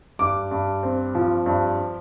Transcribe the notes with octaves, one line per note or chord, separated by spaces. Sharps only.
G2 D6
G2
C4
F3
G2